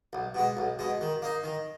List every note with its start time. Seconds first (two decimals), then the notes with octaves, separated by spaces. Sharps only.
0.13 B1
0.35 B2 G#3
0.57 B1
0.79 B2 G#3
1.01 D#3
1.22 A#3 D#4
1.44 D#3